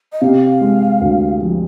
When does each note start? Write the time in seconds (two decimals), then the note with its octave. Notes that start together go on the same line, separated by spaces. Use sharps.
0.12 D#5
0.21 C3 F5
0.61 G#3
1.01 D2
1.41 F3